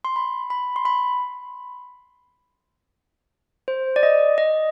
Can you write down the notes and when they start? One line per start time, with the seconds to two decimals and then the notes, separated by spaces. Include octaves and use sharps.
0.05 C6
0.16 B5
0.50 B5
0.76 C6
0.85 B5
3.68 C5
3.96 D5
4.03 D#5
4.38 D#5